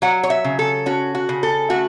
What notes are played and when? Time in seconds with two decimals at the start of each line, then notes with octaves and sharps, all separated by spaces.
0.02 F#3 F#5
0.23 C#5
0.30 E5
0.44 C#3
0.59 A4
0.86 C#4 F#4
1.15 F#4
1.29 C#3
1.43 A4
1.70 A3 F#4